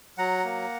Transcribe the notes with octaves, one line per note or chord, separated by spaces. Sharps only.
F#3 F#5 A#5
A#3